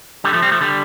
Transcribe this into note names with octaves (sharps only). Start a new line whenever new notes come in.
D3 G3
F3 A3
G3 C4
F3 A3
D3 G3